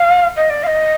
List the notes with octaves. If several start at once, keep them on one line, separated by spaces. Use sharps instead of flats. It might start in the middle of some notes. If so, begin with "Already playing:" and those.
Already playing: F5
D#5
D5
F5
D#5